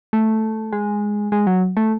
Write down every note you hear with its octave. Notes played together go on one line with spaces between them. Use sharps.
A3
G#3
G#3
F#3
A3